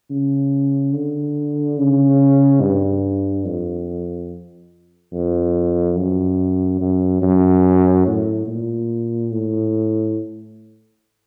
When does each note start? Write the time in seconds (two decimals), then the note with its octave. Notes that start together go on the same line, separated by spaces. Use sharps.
0.10 C#3
0.94 D3
1.78 C#3
2.62 G2
3.45 F2
5.13 F2
5.97 F#2
6.81 F#2
7.22 F#2
8.06 A2
8.47 A#2
9.32 A2